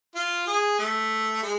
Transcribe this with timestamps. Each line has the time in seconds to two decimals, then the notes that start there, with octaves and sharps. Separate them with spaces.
0.15 F4
0.47 G#4
0.79 A3
1.42 G#3